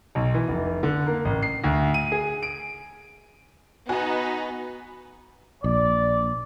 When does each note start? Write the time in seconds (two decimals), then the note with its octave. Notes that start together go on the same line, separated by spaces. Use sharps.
0.15 B1
0.34 E3
0.48 F1
0.83 D3
1.06 A#3
1.25 A1
1.43 C7
1.64 D2
1.94 D#7
2.12 G#4
2.43 D7
3.89 B3 D#4 F#4 B4 G#5
5.64 A#1 D5